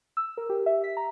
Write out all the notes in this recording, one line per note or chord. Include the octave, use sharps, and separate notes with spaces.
E6
A#4
G4
E5
B6
A#5